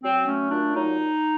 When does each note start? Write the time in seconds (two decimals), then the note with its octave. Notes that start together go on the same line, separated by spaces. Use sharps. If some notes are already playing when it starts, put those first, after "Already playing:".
0.03 F#3 C4
0.27 A3 C#4
0.51 A#2 D4
0.75 F#3 D#4